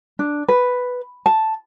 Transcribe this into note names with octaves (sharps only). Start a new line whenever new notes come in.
D4
B4
A5